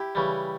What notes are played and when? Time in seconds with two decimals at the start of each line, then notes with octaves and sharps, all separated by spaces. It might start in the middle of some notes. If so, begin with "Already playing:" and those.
Already playing: E4 G4
0.15 C#3 E3 G3